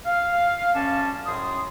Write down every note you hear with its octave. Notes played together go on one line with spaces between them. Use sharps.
F5
F#2 C#4 D5 A5
F#2 A2 G#4 C6 D#6